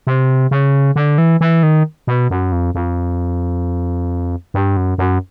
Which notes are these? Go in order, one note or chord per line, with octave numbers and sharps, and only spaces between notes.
C3
C#3
D3
E3
E3
D#3
B2
F#2
F2
F2
G2
F#2
F#2